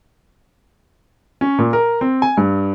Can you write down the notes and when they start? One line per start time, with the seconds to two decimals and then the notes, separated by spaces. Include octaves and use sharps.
1.41 C#4
1.59 A#2
1.73 A#4
2.01 C4
2.22 G#5
2.37 G2